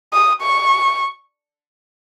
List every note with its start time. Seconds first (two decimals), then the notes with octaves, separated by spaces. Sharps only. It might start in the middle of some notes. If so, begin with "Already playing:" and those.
0.13 D#6
0.42 C#6